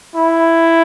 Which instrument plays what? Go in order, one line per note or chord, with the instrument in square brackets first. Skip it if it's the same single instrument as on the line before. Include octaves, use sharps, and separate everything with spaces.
[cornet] E4